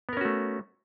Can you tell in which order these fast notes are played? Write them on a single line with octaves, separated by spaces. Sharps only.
B3 A#4 C#4 F#4 A3